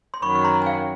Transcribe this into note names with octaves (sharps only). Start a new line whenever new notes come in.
C6
F#2 D#3 F#3 B5 C#6
C#6
A#5 C6
G#5
F5 G5